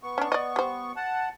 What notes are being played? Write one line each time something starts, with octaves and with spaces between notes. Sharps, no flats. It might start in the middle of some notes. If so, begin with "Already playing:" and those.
B3 C#6
C#4 D4
D5 D#5
G3 C5
F#5 A5